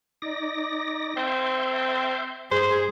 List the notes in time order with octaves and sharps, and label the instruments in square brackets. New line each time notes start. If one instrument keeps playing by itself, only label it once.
[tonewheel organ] D#4 D5 A#6
[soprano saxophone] C4 [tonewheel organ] E5 C6 G6
[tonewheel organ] G2 [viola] G#4 [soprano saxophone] C5